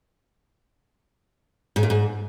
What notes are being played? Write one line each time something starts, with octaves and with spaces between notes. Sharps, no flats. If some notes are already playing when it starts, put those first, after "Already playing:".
G#2
A#2
G#2